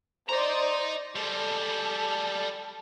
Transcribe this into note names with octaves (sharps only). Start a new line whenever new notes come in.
C5 D5 D#5 A#5
G3 G#3 A4